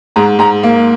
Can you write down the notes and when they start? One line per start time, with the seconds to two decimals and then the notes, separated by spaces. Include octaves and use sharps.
0.16 G#2 A#5
0.39 G#2 A#5
0.63 A#3